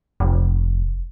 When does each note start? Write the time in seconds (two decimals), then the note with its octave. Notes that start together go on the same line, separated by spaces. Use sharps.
0.20 F1